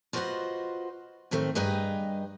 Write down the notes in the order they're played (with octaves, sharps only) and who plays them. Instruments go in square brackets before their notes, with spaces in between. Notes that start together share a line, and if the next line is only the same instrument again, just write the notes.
[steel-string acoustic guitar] F4 F#4 B4 C5 D#5 F#5
A2 D#3 A3 C4
G2 G#4 B4 D#5 G5 A#5